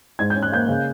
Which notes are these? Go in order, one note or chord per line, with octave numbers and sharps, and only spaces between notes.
G#2 G#6
C#4 G6
F#6
A#3 G6
C#3